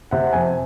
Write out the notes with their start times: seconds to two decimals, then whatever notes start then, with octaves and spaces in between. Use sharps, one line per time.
0.11 C3 F#5
0.33 F2 G#5